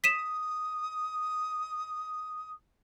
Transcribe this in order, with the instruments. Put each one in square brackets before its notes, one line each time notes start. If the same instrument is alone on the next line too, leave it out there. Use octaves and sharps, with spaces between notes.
[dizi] D#6 [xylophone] B6 D#7 E7